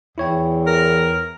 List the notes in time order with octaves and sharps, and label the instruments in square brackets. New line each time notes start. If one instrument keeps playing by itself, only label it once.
[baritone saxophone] E2 [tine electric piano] E4 C#5 G5
[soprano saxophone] A#4